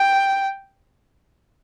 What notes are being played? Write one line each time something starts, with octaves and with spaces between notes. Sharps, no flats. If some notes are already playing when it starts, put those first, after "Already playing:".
Already playing: G5